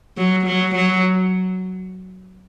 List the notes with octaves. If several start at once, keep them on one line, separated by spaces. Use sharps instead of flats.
F#3
F#3
F#3